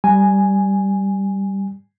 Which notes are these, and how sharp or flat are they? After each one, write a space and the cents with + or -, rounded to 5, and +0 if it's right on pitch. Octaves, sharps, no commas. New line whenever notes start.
G3 -5 G#5 +0